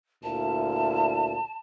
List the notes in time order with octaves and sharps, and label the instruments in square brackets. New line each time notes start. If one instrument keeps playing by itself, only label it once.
[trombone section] D2 A#2 E4 [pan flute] A5